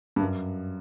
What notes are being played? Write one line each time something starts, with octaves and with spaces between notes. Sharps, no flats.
G2
F#2